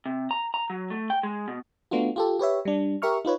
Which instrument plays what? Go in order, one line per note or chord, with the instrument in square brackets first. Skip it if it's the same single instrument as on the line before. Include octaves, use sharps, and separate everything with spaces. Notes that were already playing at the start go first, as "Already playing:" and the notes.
[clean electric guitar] C3
A#5
A#5
F#3
A3
G5
G#3
B2
[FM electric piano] A3 B3 D4 F4 F#4
F4 G4 A4
G4 B4 C#5 E5
G3 D4
G4 A#4 E5 C#6 F6
D#4 F4 B4 C#5